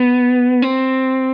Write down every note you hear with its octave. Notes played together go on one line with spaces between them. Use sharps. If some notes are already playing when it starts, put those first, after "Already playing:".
Already playing: B3
C4